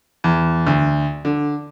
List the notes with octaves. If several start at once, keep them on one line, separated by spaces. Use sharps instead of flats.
E2
D2
D3